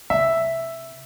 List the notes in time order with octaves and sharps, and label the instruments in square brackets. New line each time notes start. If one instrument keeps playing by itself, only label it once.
[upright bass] C3 [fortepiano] E5